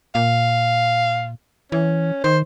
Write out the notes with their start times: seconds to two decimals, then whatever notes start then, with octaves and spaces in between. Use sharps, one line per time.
0.15 A#2 F5
1.72 E3 C#4
2.24 D#3 C5